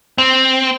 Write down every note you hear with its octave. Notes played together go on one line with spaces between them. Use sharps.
C4